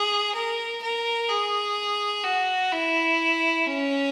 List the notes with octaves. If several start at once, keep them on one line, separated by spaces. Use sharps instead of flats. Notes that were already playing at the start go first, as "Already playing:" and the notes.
Already playing: G#4
A#4
A#4
G#4
F#4
E4
C#4